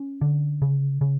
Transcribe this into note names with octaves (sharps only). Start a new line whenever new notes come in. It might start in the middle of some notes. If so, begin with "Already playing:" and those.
Already playing: C#4
D3
C#3
C#3